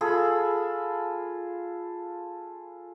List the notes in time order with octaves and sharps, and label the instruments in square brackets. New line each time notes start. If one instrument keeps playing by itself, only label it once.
[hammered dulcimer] F4 G#4 A4 B5